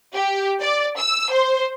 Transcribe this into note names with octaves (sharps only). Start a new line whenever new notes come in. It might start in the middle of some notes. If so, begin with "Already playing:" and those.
G4
D5
E6
C5